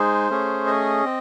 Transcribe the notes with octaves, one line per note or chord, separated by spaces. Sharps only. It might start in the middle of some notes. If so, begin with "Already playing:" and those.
Already playing: G#3 D#4 G#4 C5
A3 C#4 G#4
D#5
C4